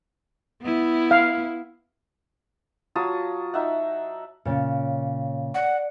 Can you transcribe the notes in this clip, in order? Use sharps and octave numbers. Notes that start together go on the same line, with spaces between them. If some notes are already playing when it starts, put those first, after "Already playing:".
B3 E4
F5
F#3 F4 A5 D#6
D#4 E5 F#5
A#2 C#3 C#5
D5 F#5